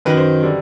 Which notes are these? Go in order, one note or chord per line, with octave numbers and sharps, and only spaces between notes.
F#2 D#3 F#3 B4
C5
D3 G3